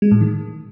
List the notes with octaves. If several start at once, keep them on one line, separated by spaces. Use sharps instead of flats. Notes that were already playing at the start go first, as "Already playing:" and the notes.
G#3
A2
D#3